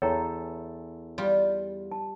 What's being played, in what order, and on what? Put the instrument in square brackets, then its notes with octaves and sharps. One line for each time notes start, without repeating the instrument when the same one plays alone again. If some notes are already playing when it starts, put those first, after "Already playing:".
[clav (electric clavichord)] E2 A4 [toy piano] C#5 G5 A#5
[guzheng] G3 F4
[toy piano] A5